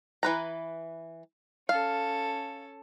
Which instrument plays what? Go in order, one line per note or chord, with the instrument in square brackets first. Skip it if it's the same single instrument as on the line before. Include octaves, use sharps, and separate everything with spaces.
[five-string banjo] E3 B4 A#5
[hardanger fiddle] C#4 A4 [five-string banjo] F5